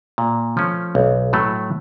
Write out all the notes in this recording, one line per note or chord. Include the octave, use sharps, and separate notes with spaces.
A#2
F3 A3 C#4
B1
A2 F#3 A3